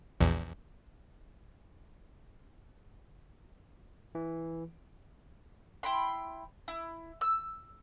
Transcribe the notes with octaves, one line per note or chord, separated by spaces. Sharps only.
A#1 E2
E3
E4 G5 B5 C6
E4
E6